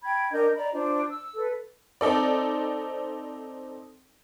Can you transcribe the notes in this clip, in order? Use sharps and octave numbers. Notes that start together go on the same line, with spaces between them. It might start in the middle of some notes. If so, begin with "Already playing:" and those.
G5 B5 G#6
D4 A#4 D#5 G6
D5 D#5 A#5 B5
D4 F4 C5
E6
A4 B4
C4 D#4 A4 D5